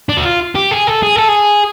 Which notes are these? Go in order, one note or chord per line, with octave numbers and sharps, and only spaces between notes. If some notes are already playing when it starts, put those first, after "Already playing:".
D4
F#4
F4
G4
G#4
A4
G#4
A4
G#4